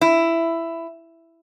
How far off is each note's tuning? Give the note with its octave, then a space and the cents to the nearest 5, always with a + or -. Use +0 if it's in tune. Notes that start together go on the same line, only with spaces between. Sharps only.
E4 +10